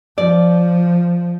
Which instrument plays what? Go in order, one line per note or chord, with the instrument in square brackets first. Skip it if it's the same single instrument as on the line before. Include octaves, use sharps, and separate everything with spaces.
[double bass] F3 [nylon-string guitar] D5